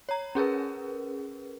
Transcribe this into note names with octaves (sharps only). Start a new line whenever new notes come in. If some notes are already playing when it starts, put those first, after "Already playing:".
C#5 A#5
C#4 G#4 A#4 B4